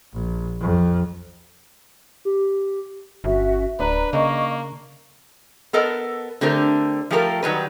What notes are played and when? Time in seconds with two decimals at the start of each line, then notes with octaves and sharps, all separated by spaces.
0.13 A#1
0.61 F2
2.25 G4
3.24 G1 C#4 F#4 E5
3.80 D1 D4 B4 A#5
4.13 C#3 A#3 D#5 C#6
5.73 B3 A4 A#4 D#5 A5
6.41 D3 A3 C4 G4 A#4
7.11 F3 G3 A3 G4 A4 A#4
7.43 D#3 F#3 G3 B4